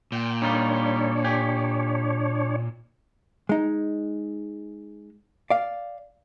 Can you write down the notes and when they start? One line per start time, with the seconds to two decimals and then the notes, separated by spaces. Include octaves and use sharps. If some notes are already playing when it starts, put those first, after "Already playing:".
0.12 A#2 G5
0.42 G3 D4 D#4 F4 C#5
1.24 G4 G#5
3.49 G#3 D#4
5.50 D5 F5